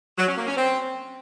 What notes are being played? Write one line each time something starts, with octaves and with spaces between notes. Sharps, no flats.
F#3
C#4
A#3
C#4
C4